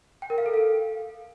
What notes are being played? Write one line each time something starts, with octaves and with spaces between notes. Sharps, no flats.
G5
A#4
F5
A4
F5